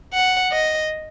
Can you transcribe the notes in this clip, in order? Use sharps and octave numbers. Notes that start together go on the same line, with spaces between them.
F#5
D#5